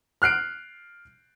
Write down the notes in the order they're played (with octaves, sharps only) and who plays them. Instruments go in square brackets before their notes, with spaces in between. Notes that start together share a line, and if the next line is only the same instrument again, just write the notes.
[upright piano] F6 F#6 C7 D7